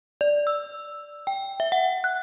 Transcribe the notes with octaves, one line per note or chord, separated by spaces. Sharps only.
D5
E6
G5
E5
F#5
F#6